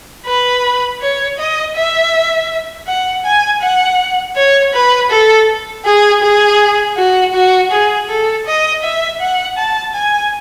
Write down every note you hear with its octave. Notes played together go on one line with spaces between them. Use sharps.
B4
C#5
D#5
E5
F#5
G#5
F#5
C#5
B4
A4
G#4
G#4
F#4
F#4
G#4
A4
D#5
E5
F#5
A5
G#5